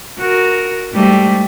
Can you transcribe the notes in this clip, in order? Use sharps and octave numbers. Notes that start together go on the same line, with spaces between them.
F#4 A#4
G#2 G3 A3